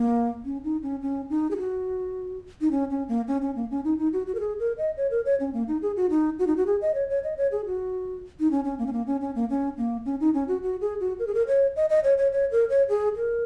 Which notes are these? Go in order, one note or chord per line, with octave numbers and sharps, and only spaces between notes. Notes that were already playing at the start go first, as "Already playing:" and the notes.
Already playing: A#3
C#4
D#4
C#4
C#4
D#4
G#4
F#4
D#4
C#4
C#4
A#3
C#4
C#4
A#3
C#4
D#4
D#4
F#4
F#4
A#4
G#4
A#4
D#5
C#5
A#4
C#5
C#4
A#3
D#4
G#4
F#4
D#4
F#4
D#4
F#4
G#4
D#5
C#5
C#5
D#5
C#5
G#4
F#4
D#4
C#4
C#4
A#3
C#4
A#3
C#4
C#4
A#3
C#4
A#3
C#4
D#4
C#4
F#4
F#4
G#4
F#4
A#4
G#4
A#4
C#5
D#5
D#5
C#5
C#5
C#5
A#4
C#5
G#4
A#4